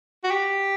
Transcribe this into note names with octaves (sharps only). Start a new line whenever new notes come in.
F#4
G4